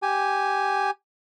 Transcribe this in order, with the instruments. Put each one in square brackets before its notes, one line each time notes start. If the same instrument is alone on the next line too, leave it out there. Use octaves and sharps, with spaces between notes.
[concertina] G4 G#5